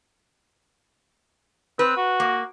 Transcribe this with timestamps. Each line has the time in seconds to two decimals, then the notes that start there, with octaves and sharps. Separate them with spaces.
1.79 C4 B4
1.97 F#4
2.20 A#3